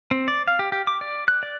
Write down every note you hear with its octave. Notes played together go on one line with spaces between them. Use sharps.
C4
D5
F5
G4
G4
D6
D5
F#6
D5